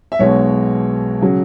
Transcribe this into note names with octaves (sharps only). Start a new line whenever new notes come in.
E5
B1 B2 G#3 C#5
C#3 F#3